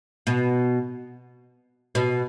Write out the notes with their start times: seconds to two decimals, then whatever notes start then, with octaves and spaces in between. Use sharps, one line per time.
0.27 B2
1.95 B2